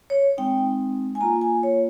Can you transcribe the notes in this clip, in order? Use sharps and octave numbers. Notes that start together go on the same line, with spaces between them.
C#5
G#3 C4 D#4 G5
G#5
A#3 F4 A#5
G#5
C#5